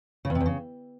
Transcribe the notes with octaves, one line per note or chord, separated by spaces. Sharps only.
C#3
E2
C3
E2
C#3